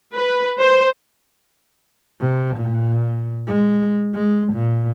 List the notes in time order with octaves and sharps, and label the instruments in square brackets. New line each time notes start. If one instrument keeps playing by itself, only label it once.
[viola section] B4
C5
[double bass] C3
A#2
G#3
G#3
A#2